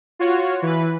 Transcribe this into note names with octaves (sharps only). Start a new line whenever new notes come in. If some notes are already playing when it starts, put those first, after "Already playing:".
F4 F#4 C#5
E3 B4